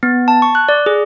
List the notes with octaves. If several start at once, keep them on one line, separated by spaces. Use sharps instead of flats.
B3
A5
C#6
F#6
D5
G#4